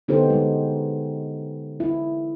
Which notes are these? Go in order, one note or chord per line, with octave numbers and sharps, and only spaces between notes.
D3 B3 D#4 G4 A4 C5
G#3 D#4
E4